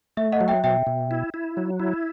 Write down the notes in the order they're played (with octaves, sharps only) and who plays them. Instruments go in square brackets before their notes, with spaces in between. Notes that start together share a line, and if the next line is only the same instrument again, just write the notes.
[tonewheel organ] A3 [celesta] E5
[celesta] D#5 F#5
[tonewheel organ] F#3
[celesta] E5 G5
[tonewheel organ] B2 [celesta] E5 G5
[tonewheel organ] B2
E4
E4
F#3
E4